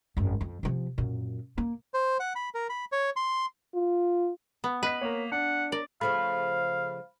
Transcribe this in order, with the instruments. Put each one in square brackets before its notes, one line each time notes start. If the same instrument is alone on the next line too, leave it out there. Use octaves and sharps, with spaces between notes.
[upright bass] G#1 F#2
F2
C3 F3
F#2 A#2
A#3
[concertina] C5
F#5
B5
A#4
B5
C#5
C6
[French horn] F4
[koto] B3
[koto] B4 [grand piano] D#5 B6
[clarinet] A#3 [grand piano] A#4 C#5
[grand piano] D4 [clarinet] F#5
[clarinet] A#4 [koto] D5
[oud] C#3 F3 A3 [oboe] F5 [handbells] B5 F6